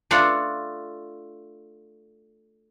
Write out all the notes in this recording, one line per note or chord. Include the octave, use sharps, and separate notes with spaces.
A3 D4 F4 F#5